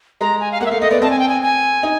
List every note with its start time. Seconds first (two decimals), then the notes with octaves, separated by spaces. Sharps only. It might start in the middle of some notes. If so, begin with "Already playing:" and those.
0.21 G#3 A#5
0.41 G#5
0.52 F5
0.61 A#3 F#5
0.66 E5
0.71 A3 F5
0.81 A3 D#5
0.91 B3 D5
1.02 C4 A5
1.11 G#5
1.19 G5
1.29 G#5
1.42 G#5
1.83 D#4